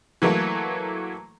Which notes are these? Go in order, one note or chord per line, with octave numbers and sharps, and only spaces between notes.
E3 F#3 A3 A#3